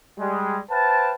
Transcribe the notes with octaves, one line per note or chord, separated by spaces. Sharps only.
G3 G#3
B4 C5 F5 G5 A5